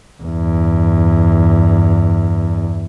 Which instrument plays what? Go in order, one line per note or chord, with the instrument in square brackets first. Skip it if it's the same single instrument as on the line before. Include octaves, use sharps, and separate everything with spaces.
[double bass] E2 G2